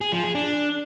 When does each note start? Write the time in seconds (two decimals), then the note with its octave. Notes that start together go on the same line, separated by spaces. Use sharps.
0.01 G#4
0.12 F3
0.24 G#4
0.35 D4